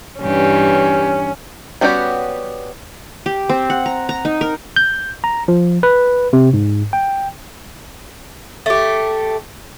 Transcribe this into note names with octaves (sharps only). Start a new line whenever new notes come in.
G2 E3 C#4 G4
G3 B3 C#4 F#4 G4
G4
C4
F#5
A#5
A#5
D#4
A#4
G6
A#5
F3
B4
C3
G#2
G5
A3 G4